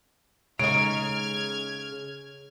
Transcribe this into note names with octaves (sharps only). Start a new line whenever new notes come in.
C#3 G#3 D#4 F6 G#6 D7